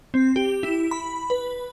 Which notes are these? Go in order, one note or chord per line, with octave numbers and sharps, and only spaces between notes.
C4
G4
E4
B5
B4